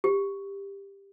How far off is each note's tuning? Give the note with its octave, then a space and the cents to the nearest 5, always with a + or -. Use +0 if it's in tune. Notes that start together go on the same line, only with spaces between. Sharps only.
G4 +15